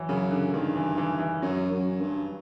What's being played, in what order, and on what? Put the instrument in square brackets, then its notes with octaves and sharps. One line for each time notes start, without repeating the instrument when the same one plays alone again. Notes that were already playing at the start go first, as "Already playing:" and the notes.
Already playing: [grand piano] E3 F#3
[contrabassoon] F#2 [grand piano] C#3
[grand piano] D3
[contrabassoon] G2 [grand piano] D#3
[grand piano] E3
E3
E3
[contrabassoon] F#2 [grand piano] F#3
[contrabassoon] F#2
G2